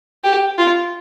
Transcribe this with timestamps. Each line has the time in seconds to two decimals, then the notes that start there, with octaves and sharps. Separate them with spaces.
0.24 G4
0.58 F4